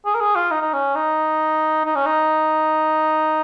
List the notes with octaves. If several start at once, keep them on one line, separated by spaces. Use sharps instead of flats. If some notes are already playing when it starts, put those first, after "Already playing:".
G#4
A#4
G#4
F4
D#4
D#4
C#4
D#4
D#4
C#4
D#4